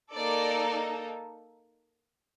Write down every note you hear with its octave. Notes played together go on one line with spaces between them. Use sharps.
A#3 D#4 A4 D5